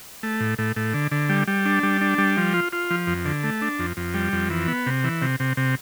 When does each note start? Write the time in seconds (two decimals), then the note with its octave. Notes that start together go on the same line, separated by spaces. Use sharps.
0.23 A3
0.40 A2
0.58 A2
0.76 A2
0.94 D3
1.11 D3
1.29 G3
1.47 G3
1.65 D4
1.83 G3
2.01 D4
2.18 G3
2.37 F3
2.54 F4
2.73 F4
2.90 F3
3.07 F2
3.25 D3
3.44 A3
3.61 D4
3.79 F2
3.97 F2
4.14 G3
4.33 F2
4.50 E3
4.68 B3
4.86 C3
5.04 E3
5.22 C3
5.40 C3
5.57 C3